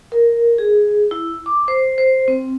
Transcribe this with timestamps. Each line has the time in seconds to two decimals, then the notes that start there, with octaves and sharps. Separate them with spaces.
0.12 A#4
0.58 G#4
1.11 E4
1.46 D6
1.68 C5
1.98 C5
2.28 C4